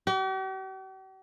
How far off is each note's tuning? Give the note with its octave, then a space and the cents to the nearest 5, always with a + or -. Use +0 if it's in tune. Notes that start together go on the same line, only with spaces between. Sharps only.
G4 -45